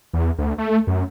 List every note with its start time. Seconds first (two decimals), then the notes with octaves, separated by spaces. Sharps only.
0.13 E2
0.38 D2
0.58 A3
0.87 F#2